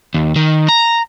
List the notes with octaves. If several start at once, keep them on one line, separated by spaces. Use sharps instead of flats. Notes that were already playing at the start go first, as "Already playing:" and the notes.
D#2
D#3
A#5